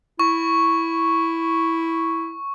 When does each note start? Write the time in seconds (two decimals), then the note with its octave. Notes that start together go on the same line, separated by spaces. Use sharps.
0.19 E4 C#6